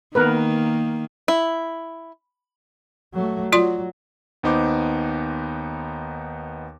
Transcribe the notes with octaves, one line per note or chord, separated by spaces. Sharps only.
D#3 A#3 B3 A#4 B4
E4
F#3 A3
F#3 F4 D5 C6
D#2 B3 D#4 C5 D6